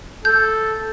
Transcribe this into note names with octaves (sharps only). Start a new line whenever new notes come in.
A4 G6